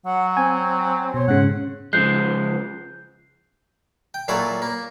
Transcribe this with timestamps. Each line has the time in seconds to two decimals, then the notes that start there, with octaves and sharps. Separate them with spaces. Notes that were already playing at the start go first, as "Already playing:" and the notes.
0.05 F#3 F#5
0.37 C4 G#5
1.14 B2 C5 C#5
1.28 G#2 C#3 F#5
1.93 C#3 F3 G#3 F#6 G6 C7
4.14 G5
4.28 A#2 F#3 E4 F4 A4 D5
4.62 A#3